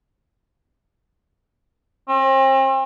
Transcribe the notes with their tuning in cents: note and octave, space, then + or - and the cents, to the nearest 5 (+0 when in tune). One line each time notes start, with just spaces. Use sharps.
C4 +40